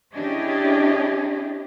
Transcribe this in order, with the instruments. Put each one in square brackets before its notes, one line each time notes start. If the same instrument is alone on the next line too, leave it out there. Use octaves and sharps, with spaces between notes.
[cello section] C#4 D4 E4 G4 G#4 D#5